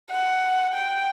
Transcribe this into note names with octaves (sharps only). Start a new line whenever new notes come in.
F#5
G5